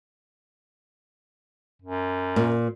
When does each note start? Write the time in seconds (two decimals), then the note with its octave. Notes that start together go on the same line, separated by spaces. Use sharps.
1.82 F#2
2.36 A#2